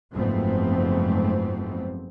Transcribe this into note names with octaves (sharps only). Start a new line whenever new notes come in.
F#1 G#2 F3 A3 B3 C4